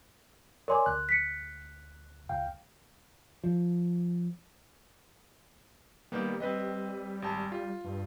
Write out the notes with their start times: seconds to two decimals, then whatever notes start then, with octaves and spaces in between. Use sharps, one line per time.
0.68 A#4 C#5 D5 G#5 C6 D6
0.86 D2 F#6
1.09 B6 C#7
2.29 C#2 F5 G5
3.44 F3
6.12 D#3 G3 A#3 B3
6.40 G3 C4 B4 D#5
7.22 G#1 A5
7.52 F4
7.84 G2